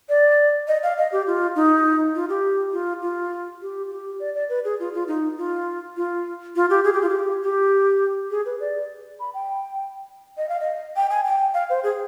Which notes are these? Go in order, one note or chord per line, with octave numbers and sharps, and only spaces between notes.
D5
D#5
F5
D#5
G4
F4
D#4
F4
G4
F4
F4
G4
G4
D5
D5
B4
G#4
F4
F4
D#4
F4
F4
F4
G4
G#4
G4
F4
G4
G4
G#4
B4
D5
B5
G5
D#5
F5
D#5
G5
G#5
G5
F5
C5
G#4